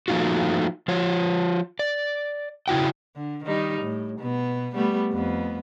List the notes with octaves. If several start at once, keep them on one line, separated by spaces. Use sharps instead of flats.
F3 A3 A#3 D#4 F4 F#4
F3 F4 C#5
D5
C#3 E4 F#4 G5
D3
D#3 G3 D#4
A2
B2 B3
G3 A3 B3
F2 B3